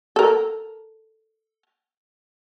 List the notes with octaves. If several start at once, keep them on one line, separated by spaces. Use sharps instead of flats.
A4 A#4